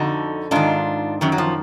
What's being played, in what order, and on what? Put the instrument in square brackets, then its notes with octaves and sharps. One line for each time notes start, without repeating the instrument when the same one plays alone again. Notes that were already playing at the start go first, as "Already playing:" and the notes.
Already playing: [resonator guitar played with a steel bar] F2 D3 D#4 F#4
G#2 D#3 D4 F4
F#2 D#3 F#3
F#3
F3